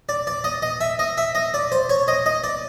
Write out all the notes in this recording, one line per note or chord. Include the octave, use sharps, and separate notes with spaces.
D5
D5
D#5
D#5
E5
D#5
E5
D#5
D5
C5
C#5
D#5
D#5
D5